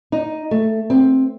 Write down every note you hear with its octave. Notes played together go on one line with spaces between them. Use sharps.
D#4
A3
C4